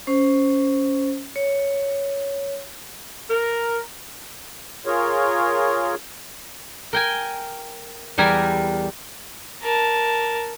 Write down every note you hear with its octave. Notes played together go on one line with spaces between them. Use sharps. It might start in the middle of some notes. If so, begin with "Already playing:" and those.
C#4 C5
C#5
A#4
F4 G#4 A#4 C#5
A#4 G5 G#5
E2 G3 A#4 G#5 A#5 B5
A#4 A5